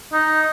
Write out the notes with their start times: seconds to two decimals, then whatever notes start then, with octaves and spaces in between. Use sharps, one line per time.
0.13 D#4